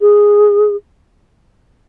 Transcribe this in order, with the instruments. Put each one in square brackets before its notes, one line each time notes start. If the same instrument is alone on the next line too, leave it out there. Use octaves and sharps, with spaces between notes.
[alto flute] G#4